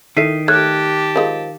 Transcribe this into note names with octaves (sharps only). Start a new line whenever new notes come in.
D#3 E4 A4 E5 B6 C7 D#7
A3 G4 C#5 A5 F6 F#6 G#6
F3 G#3 C#4 A#4 F5